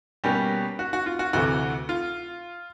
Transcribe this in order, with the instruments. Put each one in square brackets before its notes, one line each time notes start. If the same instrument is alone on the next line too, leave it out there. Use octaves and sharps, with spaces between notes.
[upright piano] B2 G3 A#3 C#4 G4
F#4
F#4
F4
F#4
D2 C3 E3 A3 F#4
F4